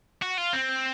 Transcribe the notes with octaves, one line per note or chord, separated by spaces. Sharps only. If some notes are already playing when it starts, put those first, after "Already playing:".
F#4
F4
C4